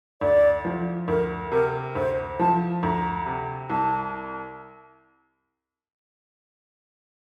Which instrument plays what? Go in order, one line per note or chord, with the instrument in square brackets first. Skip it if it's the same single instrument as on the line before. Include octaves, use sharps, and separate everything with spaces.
[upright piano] D2 [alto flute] D5
[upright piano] F3
[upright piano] D2 [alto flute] A#4
[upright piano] C3 [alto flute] A#4
[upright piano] D2 [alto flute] C5
[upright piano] F3 [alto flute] A5
[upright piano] D2 [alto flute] A#5
[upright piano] C3
[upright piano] C2 [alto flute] A5